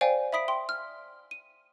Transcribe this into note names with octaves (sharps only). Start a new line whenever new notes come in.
C5 D5 F5 G5 G#5
E5 B5 D#6 B6 D7
G5 C6
F6
D#7